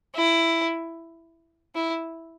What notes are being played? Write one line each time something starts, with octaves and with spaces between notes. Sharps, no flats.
E4
E4